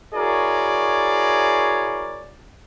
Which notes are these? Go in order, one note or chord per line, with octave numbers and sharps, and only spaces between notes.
E4 F#4 G#4 A#4 C#5 D5